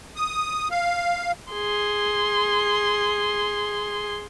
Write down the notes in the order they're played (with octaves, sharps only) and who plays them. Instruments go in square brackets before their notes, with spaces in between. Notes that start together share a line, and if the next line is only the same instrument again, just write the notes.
[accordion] D#6
F5
[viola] G#4 C6